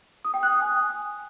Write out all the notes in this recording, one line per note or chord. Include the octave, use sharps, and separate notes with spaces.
D#6
G5
F#6
D#6
G#5